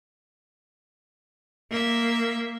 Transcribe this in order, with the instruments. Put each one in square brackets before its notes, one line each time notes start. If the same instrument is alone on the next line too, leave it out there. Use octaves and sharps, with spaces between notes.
[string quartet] A#3 E5